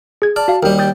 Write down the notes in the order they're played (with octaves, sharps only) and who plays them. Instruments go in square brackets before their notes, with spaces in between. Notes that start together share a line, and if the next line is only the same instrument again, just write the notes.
[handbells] G#4 G#6
[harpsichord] D5 [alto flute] A5 [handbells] F6
[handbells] F#4 F5
[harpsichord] D#2 G3 [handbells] A#4 [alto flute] G5
[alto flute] G5 [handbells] D#6 G6 A6